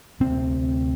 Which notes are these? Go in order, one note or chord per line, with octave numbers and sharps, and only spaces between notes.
D2 C3 C4